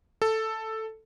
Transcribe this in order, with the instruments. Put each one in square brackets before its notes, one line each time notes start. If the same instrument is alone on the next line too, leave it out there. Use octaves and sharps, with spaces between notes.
[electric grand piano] A4